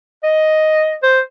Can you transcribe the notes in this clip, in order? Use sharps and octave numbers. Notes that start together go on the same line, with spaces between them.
D#5
C5